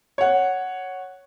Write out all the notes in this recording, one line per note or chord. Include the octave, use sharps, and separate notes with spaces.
C#5 F#5